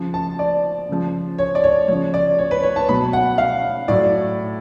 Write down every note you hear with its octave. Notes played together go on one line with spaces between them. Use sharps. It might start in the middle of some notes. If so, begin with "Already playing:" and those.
Already playing: C#3 F3
A5
D5
C#3 F3
C#5
D5
C#5
C#3 F3 C#5
D5
C#5
B4
C#5
A5
B2 F#3 B5
F#5
F5
A2 F#3 D5